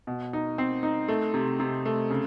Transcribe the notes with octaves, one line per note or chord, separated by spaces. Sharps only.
B2
D#4
C4
D#4
A3
C3
C3
A3
C#3